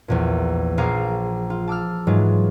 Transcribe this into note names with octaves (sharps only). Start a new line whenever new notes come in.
A#1 E2 A#2
A#1 G#4 F5 A#5 D6
F4
A5 D6 E6 F6
G#2 E3 F#3 G#3 F4